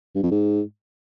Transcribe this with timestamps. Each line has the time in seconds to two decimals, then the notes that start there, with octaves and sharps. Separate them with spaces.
0.15 G2
0.23 F2
0.31 G#2